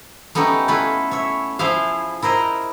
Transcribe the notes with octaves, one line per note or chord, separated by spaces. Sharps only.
A3 B3 C#4 D#4 G4
A3 E4 F4 B4 G#5
C#5 E5
F3 E4 G#4 C5 E5 F5
E4 A#4 C5 D#5